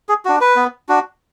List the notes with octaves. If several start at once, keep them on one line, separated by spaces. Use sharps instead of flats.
G#4
D4 F#4
B4
B3
D4 F#4